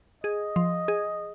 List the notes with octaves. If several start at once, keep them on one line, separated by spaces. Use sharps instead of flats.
G#4 D#5
F3
G#4